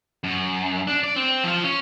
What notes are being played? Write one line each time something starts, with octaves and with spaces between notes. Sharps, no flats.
F#2
D4
D5
C4
F3 F5
C#4